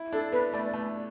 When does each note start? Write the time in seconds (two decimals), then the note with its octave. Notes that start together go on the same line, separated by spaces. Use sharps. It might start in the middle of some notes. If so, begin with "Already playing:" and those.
Already playing: E4
0.13 D4 A4
0.32 B3 B4
0.52 A3 D5
0.73 A3